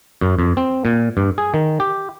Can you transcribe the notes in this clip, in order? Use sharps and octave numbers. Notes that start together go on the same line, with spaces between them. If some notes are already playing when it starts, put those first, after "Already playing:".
F#2
F2
C4
A#2
G2
G#4
D#3
G4